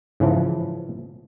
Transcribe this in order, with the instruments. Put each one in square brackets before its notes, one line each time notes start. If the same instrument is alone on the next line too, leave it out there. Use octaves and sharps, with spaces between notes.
[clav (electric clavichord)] G#2 C#3 E3 F3